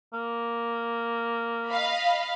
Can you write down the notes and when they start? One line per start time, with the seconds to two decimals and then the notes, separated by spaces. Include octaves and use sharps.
0.14 A#3
1.69 D#5 F5 B5